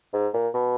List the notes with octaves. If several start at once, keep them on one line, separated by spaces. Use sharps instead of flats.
G#2
A#2
B2